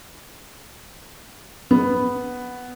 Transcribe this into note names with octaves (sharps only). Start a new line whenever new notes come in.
B3